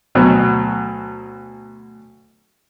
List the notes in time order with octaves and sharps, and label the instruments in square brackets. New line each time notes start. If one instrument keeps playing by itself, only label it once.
[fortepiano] D2 B2 F#3